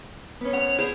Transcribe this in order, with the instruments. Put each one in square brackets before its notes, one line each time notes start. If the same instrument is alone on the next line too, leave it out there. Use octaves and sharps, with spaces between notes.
[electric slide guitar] B3 C#4
[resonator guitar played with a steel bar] F#5 [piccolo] F7
[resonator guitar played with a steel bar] E4 G#4 C5